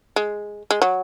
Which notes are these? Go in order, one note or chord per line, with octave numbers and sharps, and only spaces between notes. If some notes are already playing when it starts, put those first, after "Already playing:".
G#3
G#3
F#3